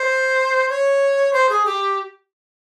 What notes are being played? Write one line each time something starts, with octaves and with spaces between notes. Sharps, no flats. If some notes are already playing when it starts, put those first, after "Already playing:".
Already playing: C5
C#5
C5
G#4
G4